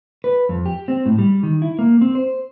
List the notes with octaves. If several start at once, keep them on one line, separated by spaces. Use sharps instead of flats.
B4
F2
G4
C4
A2
G3
D#3
E4
A#3
C4
C5